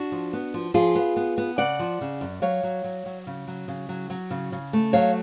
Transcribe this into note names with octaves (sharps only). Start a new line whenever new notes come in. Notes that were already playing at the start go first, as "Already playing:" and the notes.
Already playing: D4 F#4
F3
B3
F3
F3 F4 G#4
B3
B3
B3
C#3 D5 F#5
F3
C#3
F#2
F#3 C#5 F5
F#3
F#3
F#3
C#3
F#3
C#3
F#3
F#3
C#3
C#3
A3
F#3 C#5 F5